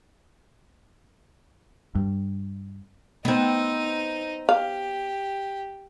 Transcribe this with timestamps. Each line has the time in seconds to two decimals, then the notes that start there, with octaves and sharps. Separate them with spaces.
1.95 G2
3.25 B3 C4 D#4
4.49 G4 F5